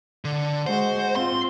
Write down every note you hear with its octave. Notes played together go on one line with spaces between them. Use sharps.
D3
G#3 F#4 C5
C4 F4 C6